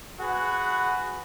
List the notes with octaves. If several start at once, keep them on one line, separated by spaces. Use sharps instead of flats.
F#4 G#4 B4 F#5